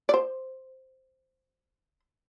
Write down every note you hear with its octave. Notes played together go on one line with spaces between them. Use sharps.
D5
C5